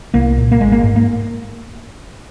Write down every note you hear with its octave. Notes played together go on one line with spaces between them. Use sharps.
C2 A#3
A#2
A#3
G#1 G#3
A#3
G#2
A#3